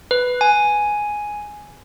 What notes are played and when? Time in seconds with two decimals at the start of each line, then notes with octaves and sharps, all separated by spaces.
0.11 B4
0.41 G#5